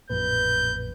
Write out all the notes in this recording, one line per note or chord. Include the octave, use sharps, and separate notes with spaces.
A1 F2 A#2 B4 G6